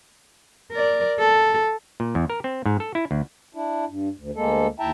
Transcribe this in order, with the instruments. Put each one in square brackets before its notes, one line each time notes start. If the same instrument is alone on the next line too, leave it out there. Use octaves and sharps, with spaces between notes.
[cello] A#4 D5
A4
[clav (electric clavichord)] A#2
E2
A#4
C4
G#2
A4
E4
D2
[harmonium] D4 E4
G2
D2
D2 G#3 A#3 A4
D#2 E4 E5 G5 A5 A#5